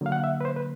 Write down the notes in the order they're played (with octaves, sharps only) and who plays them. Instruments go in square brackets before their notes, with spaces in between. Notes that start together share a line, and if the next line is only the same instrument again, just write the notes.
[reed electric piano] D3 F#3 A#3 F5
F#5
E5
B4
C5
B4